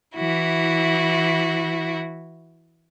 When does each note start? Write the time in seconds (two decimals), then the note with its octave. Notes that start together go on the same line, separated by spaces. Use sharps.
0.15 E3 E4 F#4